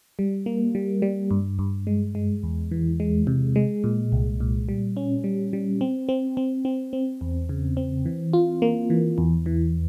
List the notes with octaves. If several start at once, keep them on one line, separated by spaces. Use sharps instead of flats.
G3
A#3
G3
G3
G2
G2
G#3
G#3
E2
E3
G#3
C3
G#3
A#2
C2
A#2
G3
C#4
G3
G3
C4
C4
C4
C4
C4
E2
C#3
C4
E3
F4
A#3
E3
E2
E3